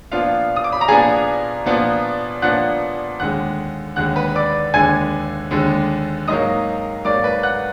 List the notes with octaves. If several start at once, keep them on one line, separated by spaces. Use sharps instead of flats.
A#2 F3 B3 D4 F4 F5
D#6
D6
B5
A#5
A#2 F3 B3 D4 G#4 G#5
A#2 F3 B3 D4
A#2 F3 B3 D4 F#5 F#6
D#2 D3 G#3 F#5 F#6
D#2 D3 G#3 F#5 F#6
B4 B5
B5
D5 D6
D#2 D3 G#3 G#5 G#6
D#2 D3 G#3
G#2 F#3 A#3 D#5 D#6
G#2 F#3 A#3 D5 D6
B4 B5
F#5 F#6